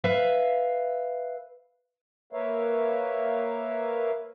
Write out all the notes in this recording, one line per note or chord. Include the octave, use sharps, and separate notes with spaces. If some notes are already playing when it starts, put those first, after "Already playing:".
B4 E5 F5
A#3 A#4 B4 C#5 E5 F5